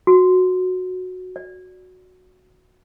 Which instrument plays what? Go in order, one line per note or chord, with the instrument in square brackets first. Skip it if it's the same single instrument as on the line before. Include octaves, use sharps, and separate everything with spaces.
[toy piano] F#4
D5